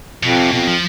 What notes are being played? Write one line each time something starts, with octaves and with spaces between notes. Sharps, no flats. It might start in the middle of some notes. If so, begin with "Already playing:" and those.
F2 B2
C3
F2 B2
F3